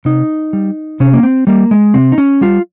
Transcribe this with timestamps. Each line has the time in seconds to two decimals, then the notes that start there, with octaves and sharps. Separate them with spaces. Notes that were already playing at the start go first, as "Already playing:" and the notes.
0.05 C3 D#4
0.53 G3
1.00 C3 C#4
1.13 A#3
1.23 C4
1.47 G3 A#3
1.71 G#3
1.94 C3 C4
2.12 D#4
2.18 C#4
2.41 G3 F4